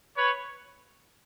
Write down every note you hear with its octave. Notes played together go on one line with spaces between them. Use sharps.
B4 C#5